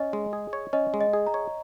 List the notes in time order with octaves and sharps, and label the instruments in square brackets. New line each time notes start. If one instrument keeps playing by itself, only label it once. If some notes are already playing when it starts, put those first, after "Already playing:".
Already playing: [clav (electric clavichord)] C#4 [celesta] D#5
[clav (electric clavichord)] G#3
G#4
C#5
[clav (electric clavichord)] C#4 [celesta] D#5
[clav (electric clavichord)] G#3
[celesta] D#5
[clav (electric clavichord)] G#4
[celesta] A#5
[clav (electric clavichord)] C#5